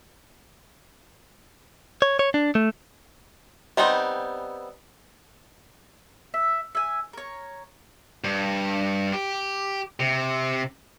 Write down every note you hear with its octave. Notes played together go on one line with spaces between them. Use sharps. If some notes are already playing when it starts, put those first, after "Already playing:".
C#5
C#5
D4
A3
G3 B3 C4 D#4
E5
E5 G#5
A#4 C#5
G2
G4
C3